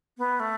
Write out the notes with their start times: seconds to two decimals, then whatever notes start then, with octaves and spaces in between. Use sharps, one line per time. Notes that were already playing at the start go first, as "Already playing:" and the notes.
0.18 B3
0.40 A3